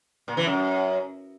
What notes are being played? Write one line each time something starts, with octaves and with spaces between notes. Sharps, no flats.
A#2
E3
F#2